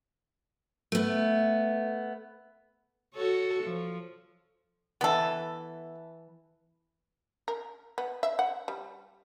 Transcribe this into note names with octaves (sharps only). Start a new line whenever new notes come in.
A3 B3
F#4 A4 C#5
F3
E3 B3 A4 B4
A#4
B3
E5
F#5
G3